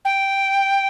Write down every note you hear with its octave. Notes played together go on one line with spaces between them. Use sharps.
G5